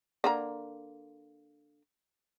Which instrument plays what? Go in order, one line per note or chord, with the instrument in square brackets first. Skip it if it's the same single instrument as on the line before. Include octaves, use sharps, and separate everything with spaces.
[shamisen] D3 A#3 A#5